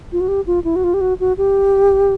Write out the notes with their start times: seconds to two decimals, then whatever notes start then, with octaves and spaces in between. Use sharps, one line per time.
0.12 F4
0.21 F#4
0.28 G4
0.47 F4
0.64 E4
0.76 F#4
0.84 F4
0.94 G4
1.01 F#4
1.20 F#4
1.38 G4